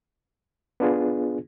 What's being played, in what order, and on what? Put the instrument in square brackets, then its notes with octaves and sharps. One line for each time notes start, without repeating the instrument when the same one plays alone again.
[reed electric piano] B3 D4 F4 G#4